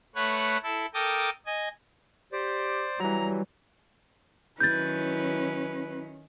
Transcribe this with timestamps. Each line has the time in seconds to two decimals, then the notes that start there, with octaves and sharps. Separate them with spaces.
0.15 A3 B4 C#5 F#5
0.63 E4 A4
0.94 A4 A#4 G5 D6 D#6
1.46 D#5 G#5
2.32 G4 C5 D5
3.00 E3 F#3 G3 A#5
4.60 D#3 F#3 C#4 E4 B4 G6 A6